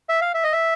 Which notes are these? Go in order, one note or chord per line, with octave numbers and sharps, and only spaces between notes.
E5
F5
E5
D#5
E5